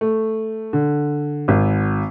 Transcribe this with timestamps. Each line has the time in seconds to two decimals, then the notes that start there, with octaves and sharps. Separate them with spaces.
0.01 A3
0.73 D3
1.48 G#1